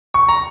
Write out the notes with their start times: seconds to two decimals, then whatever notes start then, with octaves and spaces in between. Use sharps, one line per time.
0.14 C#6
0.29 A#5